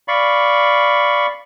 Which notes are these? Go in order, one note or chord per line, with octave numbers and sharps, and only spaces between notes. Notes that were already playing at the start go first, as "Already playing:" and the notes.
D5 F5 B5 C#6